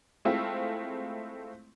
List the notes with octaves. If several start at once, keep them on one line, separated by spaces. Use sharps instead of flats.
G#3 A3 C4 E4 F4